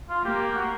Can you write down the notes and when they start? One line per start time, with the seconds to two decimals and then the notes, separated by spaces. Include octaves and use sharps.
0.09 F4
0.24 A#3 G4
0.55 F#4